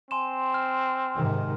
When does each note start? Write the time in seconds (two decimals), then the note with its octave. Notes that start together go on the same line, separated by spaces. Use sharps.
0.11 C4 G#5 C6 E7
0.54 F6
1.15 G#2 C3 D#3